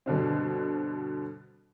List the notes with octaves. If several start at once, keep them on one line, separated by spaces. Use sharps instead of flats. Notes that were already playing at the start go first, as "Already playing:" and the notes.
G2 B2 D3 C4